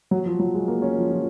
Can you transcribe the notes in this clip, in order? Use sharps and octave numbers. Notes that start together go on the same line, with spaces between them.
F#3
F3
F#3
G#3
A#3
C#4
F3
F3